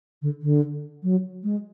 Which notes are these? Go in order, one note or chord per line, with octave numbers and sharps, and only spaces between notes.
D3
D3
F#3
G#3